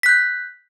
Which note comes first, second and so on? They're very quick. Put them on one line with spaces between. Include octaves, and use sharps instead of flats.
B6 F#6 G6